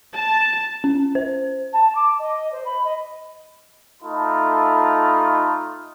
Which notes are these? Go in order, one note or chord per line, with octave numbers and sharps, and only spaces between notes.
A5
C#4
C5
A5
D6
D#5
C5
B5
D#5
A3 D#4 F4 A4 B5